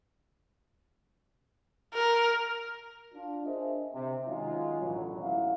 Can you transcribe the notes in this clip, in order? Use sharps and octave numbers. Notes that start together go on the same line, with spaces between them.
A#4
D4 F4
D4 G#4 A#4 C5 D#5 E5
C3
D#3 F#3 G#3 C#4 D#4 F4
A1 F#2 B2 D3 F#3
A1 G#2 F#3 E4 E5 F5